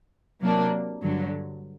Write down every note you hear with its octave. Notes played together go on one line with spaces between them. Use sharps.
C3 F#3 A#3 D4
G2 D3 F#3